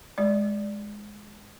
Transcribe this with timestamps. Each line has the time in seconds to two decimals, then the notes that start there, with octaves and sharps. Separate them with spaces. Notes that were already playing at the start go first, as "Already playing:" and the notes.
0.18 G#3 D5